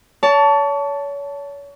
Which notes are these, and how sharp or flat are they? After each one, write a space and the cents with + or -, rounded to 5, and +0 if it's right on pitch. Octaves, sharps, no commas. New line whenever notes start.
C#5 +35 A5 +0